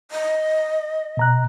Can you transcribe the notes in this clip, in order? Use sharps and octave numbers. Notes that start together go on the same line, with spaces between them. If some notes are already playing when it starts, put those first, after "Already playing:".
D#5
B2 A#5 F#6